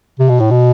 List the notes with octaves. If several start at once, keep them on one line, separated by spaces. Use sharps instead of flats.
C3
B2
A2
B2